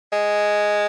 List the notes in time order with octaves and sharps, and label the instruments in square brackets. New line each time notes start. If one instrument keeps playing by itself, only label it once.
[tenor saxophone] G#3